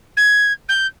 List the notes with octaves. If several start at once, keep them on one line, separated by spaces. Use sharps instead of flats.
G#6
G6